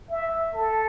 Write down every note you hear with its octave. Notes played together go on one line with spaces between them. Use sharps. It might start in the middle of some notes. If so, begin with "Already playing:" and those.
E5
A4